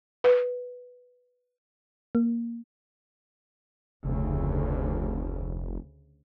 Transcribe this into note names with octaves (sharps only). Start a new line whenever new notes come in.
B4
A#3
F1 D2 C#3